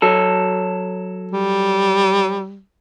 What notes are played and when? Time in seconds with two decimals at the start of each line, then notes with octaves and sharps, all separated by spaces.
0.02 F#3 A4
1.31 G3